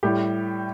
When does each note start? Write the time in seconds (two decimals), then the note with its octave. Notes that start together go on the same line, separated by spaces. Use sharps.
0.03 A2 G3 G4